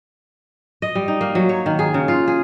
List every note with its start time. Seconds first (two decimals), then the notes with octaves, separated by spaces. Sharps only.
0.82 D#5
0.95 G3
1.08 D#4
1.21 A#3
1.35 F#3
1.49 C#5
1.66 D#3
1.79 G#4
1.94 C#3
2.08 F4
2.28 G#4